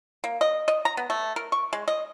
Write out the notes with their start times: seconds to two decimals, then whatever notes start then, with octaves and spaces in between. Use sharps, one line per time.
0.24 A#3
0.41 D#5
0.68 D#5
0.85 A#5
0.97 B3
1.10 A3
1.36 A#4
1.52 C#6
1.73 G#3
1.88 D#5